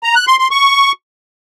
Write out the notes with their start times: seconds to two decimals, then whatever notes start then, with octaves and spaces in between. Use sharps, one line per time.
0.03 A#5
0.15 F#6
0.27 C6
0.39 C6
0.51 C#6